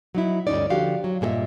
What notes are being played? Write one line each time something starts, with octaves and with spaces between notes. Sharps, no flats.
F#3 D#4 E4
D2 G2 C#3 C#4 D#4 D5
D3 F3 F#4 G4 F5
F#3
G2 A#2 G#4 D#5 E5